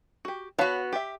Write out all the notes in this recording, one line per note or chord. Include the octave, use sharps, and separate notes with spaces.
F#4 G4
B3 F#4 C#5 F5 A5
G4 E5